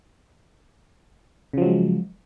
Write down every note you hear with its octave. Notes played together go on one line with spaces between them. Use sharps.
C#3 F3 F#3 G#3